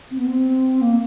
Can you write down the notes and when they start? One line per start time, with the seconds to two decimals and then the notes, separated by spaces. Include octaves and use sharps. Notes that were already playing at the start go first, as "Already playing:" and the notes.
0.11 C4
0.18 B3
0.27 C4
0.81 A#3